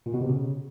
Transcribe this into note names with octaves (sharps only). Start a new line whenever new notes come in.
A#2
B2
C3
C#3